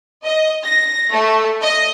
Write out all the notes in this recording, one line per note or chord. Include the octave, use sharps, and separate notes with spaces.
D#5
A#6
A3
D#5